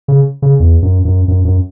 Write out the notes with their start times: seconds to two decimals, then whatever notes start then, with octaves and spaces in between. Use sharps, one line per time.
0.08 C#3
0.42 C#3
0.60 E2
0.82 F#2
1.05 F#2
1.28 F#2
1.45 F#2